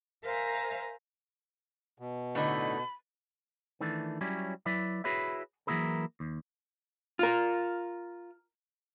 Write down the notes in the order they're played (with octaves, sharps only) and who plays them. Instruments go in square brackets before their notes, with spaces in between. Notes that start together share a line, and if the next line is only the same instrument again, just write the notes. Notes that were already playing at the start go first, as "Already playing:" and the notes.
[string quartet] A#4 C5 E5 F5 G#5 A#5
[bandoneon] B2
[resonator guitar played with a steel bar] A2 D3 D#4 [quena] B5
[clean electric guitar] D#3 E3 A3 D4
F#3 G3 C#4 E4
F#3 E4 B4 D5 E5
E4 F#4 G#4 B4 C#5 E5
E3 F#3 A#3 E4 G#4 A#4
D#2
[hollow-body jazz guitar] F4 A#4